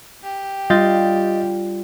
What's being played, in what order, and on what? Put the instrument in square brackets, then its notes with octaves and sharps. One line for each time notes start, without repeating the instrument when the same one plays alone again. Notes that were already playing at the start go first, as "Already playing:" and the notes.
[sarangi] G4
[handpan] G3 [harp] F4 [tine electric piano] D#5 G6 A6